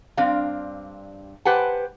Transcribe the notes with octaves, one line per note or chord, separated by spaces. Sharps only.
G2 C4 D4 F5
G4 B4 C5 F#5 G#5 A5